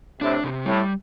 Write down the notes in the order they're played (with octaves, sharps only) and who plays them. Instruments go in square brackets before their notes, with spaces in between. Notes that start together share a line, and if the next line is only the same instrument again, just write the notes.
[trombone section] A2 C3 [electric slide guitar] D4
[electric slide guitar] C3
[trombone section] A2 [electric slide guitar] G3